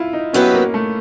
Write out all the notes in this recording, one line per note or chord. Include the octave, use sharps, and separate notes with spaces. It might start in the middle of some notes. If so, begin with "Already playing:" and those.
Already playing: E4 F4
D#4
F#3 B3 C#4 E4 G4 B4
A#3
A3